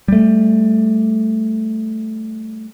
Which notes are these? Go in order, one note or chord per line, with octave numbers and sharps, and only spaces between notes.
G3 A3